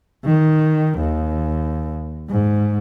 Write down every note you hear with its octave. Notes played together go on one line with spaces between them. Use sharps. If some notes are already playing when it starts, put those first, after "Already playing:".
D#3
D#2
G#2